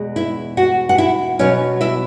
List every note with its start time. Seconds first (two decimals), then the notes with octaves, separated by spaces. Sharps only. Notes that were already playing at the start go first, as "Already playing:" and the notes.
Already playing: E2 B2 G#3
0.16 E4 E5
0.57 F#4 F#5
0.89 F#5
0.98 E4 E5
1.39 B2 F#3 B3 C#4 C#5
1.81 E4 E5